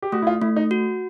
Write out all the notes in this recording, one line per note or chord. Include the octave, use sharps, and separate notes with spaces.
G4
A3 F#4
E4
F4
A3 E4
D#4
F#4